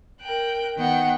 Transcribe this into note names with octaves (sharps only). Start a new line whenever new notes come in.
A#4 G5 F#6
D#3 B3 F#5 G5